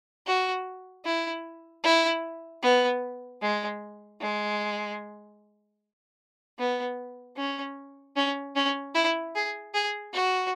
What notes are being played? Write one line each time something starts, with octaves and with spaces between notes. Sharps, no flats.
F#4
E4
E4
B3
G#3
G#3
B3
C#4
C#4
C#4
E4
G#4
G#4
F#4